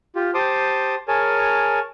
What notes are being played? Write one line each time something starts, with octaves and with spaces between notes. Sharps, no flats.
F4 G4
G4 C5 A5 C6 D6 D#6
G#4 A#4 C#5 G#5 A5